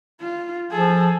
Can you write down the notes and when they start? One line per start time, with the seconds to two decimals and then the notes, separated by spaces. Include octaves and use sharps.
0.21 F4
0.71 F3 G#4 A4